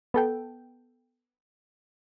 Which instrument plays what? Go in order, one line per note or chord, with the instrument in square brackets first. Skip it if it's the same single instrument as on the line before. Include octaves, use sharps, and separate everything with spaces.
[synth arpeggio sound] B3 A4 G5